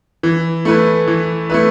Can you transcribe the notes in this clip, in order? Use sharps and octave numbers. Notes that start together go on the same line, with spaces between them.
E3
A3 E4 B4
E3
A3 E4 B4